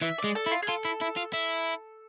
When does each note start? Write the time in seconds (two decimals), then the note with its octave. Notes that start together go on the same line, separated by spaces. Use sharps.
0.02 E3 E5
0.18 D5
0.24 G#3
0.35 A4
0.46 E4
0.51 F4
0.62 G#4
0.68 F4 A4
0.85 E4
1.01 E4
1.17 F4
1.33 E4